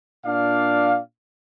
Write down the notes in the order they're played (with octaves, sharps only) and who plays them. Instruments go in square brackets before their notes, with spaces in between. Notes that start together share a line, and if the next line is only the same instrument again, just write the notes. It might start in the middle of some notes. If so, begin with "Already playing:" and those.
[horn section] A#2 D4 D5 F5